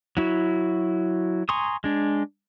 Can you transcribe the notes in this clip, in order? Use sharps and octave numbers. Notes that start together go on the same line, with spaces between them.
F#3 E4 F#4
G#5 A#5 C6 C#6 D#6
G#3 D4